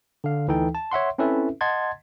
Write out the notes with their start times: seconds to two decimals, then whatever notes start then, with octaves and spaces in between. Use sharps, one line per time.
0.24 D3 F5
0.48 D2 E3 D#4 A4 G5
0.75 A5
0.91 C#5 E5 F#5 C6
1.18 C4 C#4 E4 A4 B4 E5
1.61 D#5 F#5 A5 C6 G#6 A6